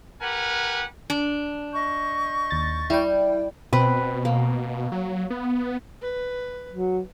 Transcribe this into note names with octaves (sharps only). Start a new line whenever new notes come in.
G4 A#4 B4 F#5 G#5
D4
D#5 C#6 G6
D#2 A6
G3 E4 G5
B2 C4 B4
A#3
F#3
B3
B4
F#3